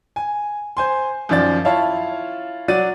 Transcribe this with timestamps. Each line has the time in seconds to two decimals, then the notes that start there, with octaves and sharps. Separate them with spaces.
0.16 G#5
0.77 C5 G#5 C6
1.29 F#2 D#3 F3 D5 A6
1.65 E4 F4 C#5 F5 A5
2.68 F#3 D5 F#5 A6 D#7